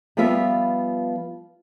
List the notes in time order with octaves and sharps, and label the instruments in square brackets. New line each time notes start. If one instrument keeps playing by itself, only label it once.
[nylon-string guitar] F3 G3 B3 F4 B4 E5